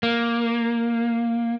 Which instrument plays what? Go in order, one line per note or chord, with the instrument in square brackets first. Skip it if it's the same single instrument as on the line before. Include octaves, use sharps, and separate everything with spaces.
[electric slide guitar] A#3